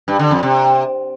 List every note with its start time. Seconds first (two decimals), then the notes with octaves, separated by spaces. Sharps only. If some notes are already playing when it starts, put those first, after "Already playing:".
0.08 G2
0.19 D3
0.31 F2
0.43 C3